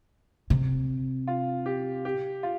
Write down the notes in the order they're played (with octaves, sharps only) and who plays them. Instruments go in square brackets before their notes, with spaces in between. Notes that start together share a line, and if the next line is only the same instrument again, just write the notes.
[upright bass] C3
[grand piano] F4
G4
G4
F4